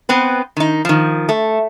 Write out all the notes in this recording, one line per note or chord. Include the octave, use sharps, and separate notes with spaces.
B3 C4 B4
D#3 D#4
D#3 F3
A3